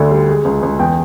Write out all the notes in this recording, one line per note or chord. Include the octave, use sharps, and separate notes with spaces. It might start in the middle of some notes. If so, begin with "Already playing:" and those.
Already playing: D2 D3
G3
G#3
C#2
C#2
E2 G5